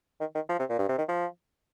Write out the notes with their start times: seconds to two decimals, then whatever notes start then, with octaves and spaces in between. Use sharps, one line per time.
0.20 D#3
0.35 D#3
0.49 F3
0.59 C3
0.70 A#2
0.79 G2
0.89 C3
0.98 D#3
1.09 F3